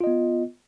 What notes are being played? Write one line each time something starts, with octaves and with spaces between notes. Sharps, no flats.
B3 F4 D#5